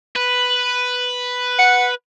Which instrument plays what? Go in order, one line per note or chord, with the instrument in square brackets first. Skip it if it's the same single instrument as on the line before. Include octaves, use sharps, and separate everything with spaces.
[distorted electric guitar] B4
[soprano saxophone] F#5